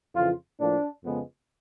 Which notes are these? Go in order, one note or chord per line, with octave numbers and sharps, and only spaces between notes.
F2 C#3 E3 F4
A2 F3 A#3 D4
F2 C#3 F3 G#3 B3